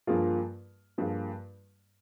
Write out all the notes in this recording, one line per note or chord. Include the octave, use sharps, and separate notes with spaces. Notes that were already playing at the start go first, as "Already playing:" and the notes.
G2 F3 A#3 F4 G#4
G2 F3 A#3 F4 G#4